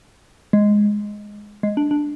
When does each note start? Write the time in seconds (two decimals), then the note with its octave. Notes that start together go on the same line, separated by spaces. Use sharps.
0.53 G#3
1.63 G#3
1.77 D4
1.91 D4